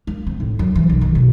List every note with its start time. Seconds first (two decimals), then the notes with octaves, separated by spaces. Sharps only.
0.07 A#3
0.27 C4
0.40 A2
0.59 F#2
0.75 E3
0.89 B1
1.01 D#3
1.15 B2